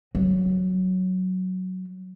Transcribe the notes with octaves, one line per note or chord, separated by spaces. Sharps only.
F#3